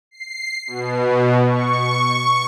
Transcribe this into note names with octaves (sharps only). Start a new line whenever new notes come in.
C7
B2
C#6